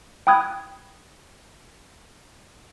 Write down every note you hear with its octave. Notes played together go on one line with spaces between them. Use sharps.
G5 B5 D#6 F#6 G#6